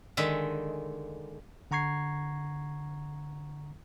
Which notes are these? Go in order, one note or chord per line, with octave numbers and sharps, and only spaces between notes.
D3 D#3 G#3 E5
D3 F#5 A#5 C#6 G#6 C7